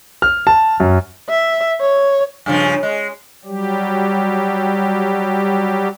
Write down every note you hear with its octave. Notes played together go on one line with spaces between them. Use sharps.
F6
A5
F#2
E5
C#5
G2 C#3 F3
G#3
F#3 G3 G4